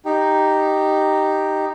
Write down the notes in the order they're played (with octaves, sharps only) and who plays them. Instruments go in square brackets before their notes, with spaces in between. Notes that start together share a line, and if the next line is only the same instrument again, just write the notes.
[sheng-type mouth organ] D#4 G4